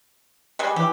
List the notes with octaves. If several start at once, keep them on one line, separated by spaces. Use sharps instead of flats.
G3 G#3
E3 G4